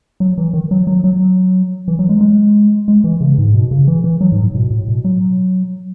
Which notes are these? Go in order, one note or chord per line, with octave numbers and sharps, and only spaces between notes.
F#3
E3
D#3
F#3
F#3
F#3
E3
F#3
G#3
G#3
G#3
E3
C#3
G#2
B2
C#3
E3
E3
F#3
G#2
A2
B2
A2
B2
F#3